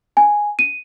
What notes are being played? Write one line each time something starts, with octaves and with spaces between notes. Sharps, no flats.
G#5
D#7